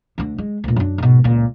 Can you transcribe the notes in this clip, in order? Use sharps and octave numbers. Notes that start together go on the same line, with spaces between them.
D2 D3
G#3
D2 A#2
F#2 D4
G#2 B2
C#2 A#2